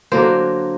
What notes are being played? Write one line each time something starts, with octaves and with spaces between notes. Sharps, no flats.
D3 F#3 A#3 C5